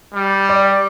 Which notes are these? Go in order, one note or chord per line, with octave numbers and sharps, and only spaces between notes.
G3
D5